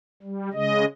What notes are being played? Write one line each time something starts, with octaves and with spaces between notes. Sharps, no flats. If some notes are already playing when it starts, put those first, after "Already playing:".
G3
C#3 G#3 D#5